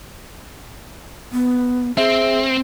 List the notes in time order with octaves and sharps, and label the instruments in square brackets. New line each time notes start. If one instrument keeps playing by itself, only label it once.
[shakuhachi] B3
[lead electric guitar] C4 [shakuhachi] G#4 [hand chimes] E5